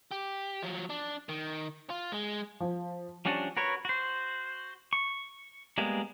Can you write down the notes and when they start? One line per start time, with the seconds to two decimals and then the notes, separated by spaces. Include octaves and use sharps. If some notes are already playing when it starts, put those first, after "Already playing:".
0.11 G4
0.63 F3 F#3
0.90 D4
1.29 D#3
1.90 F4
2.12 G#3
2.60 F3
3.25 F3 G3 C#4 D4 F#4
3.57 F#4 A#4 B4 C#5
3.85 F#4 C5
4.93 C#6
5.78 G3 G#3 A#3 B3